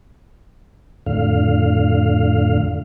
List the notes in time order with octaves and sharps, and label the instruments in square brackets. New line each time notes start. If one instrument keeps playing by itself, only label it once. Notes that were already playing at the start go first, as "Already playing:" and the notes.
[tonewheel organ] F2 A2 D3 F5